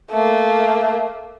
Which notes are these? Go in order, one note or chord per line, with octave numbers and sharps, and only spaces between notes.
A3 A#3